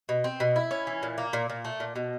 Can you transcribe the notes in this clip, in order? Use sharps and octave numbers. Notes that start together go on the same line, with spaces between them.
B2
C4
B2
E4
C#4
E3
A#2
A#3
A#2
A#2
A3
A#2
B2